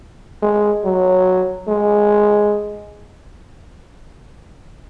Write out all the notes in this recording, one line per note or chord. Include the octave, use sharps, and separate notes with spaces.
G#3
F#3
G#3